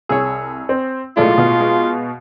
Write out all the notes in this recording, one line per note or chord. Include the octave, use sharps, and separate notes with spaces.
C2 G#4 C#5 E6
C4
B1 A2 G#3 F4 A4 D5
B2 F5
G#3